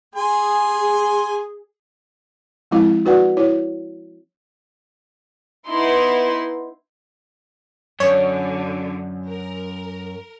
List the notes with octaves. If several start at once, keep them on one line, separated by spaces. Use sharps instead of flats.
G#4 G#5 C6
F3 G#3 C4 E4 F5
D#4 F#4 B4 D5 F#5
E4 C#5
B3 D#4 E4 C6
F#2 D3 C#5
A#4